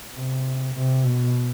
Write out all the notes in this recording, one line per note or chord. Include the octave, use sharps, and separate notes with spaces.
C3
C3
B2